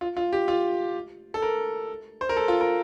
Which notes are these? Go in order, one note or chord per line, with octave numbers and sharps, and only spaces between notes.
F4
F4
G4
F4
A4
A#4
C5
A#4
A4
F4
A#4